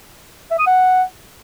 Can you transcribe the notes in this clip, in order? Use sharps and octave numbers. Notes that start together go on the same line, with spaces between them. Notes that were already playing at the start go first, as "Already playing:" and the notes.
E5
D#6
F#5